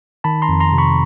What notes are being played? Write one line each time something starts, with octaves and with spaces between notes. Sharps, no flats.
D#3 A5 B5
A#5 C6
F2
A#5 C6
C3
B5 C#6